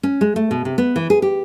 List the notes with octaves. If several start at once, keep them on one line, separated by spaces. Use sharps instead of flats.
C#4
G#3
A3
B2
C3
B3
E3
G#4
G4